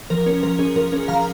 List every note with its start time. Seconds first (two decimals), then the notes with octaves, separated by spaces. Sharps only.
0.10 F3 A#4
0.26 C#4 A#4
0.43 F3 A#4
0.59 C#4 G#4
0.76 F3 A#4
0.92 C#4 A#4
1.08 F3 F5 A#5